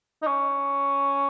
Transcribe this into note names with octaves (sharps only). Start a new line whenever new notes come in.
D#4
C#4